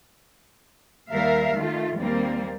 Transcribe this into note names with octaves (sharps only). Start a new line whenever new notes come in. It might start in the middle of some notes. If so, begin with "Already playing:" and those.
D#2 G3 A#4 E5 F5
D#3 A3 F4
D#2 G3 A#3 C4